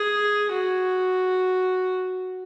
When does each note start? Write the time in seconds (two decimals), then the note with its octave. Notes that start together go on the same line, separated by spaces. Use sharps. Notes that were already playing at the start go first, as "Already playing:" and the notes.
Already playing: G#4
0.52 F#4